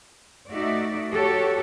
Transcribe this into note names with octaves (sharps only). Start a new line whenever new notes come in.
A3 D#4 F#4 D5 E5
F#4 G4 A4 C#5